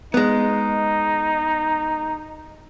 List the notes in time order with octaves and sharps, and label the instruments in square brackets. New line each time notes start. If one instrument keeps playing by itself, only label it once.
[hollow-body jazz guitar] G#3 B3 [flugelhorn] D#4